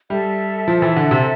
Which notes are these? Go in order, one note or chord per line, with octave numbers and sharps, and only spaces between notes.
G3 A4 E5 A5
F3
E3
D3
C3